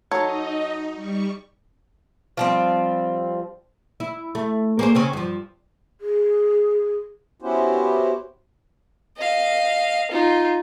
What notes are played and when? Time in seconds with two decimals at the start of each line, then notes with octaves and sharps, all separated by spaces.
0.11 F#3 D#4 A4 C#5 D#5
0.93 G3 C#6
2.37 F3 G3 C4
4.00 E4
4.35 A3
4.79 A#3 G#4 C5
4.95 C#3 C4 C#4
5.13 G2 F3
6.01 G#4
7.42 B3 C#4 E4 F#4 G4 C5
9.17 D#5 F5
10.11 D#4 F4